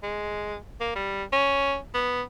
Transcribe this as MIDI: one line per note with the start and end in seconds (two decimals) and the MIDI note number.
0.03 0.57 56
0.80 0.92 58
0.95 1.24 55
1.32 1.76 61
1.94 2.22 59